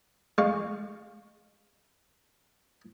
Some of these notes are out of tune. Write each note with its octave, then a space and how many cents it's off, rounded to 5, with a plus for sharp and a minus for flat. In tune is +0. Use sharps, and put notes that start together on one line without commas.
G#3 -20 F5 +10 C#6 +0